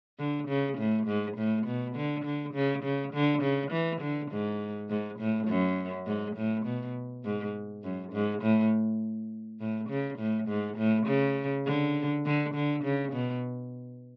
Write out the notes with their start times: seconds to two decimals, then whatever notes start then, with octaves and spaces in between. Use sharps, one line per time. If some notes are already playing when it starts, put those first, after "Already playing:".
0.19 D3
0.48 C#3
0.78 A2
1.07 G#2
1.38 A2
1.67 B2
1.96 D3
2.25 D3
2.54 C#3
2.84 C#3
3.14 D3
3.43 C#3
3.72 E3
4.02 D3
4.31 G#2
4.90 G#2
5.20 A2
5.48 F#2
6.07 G#2
6.36 A2
6.66 B2
7.25 G#2
7.84 F#2
8.13 G#2
8.43 A2
9.60 A2
9.90 C#3
10.19 A2
10.49 G#2
10.78 A2
11.07 C#3
11.66 D3
12.25 D3
12.55 D3
12.84 C#3
13.13 B2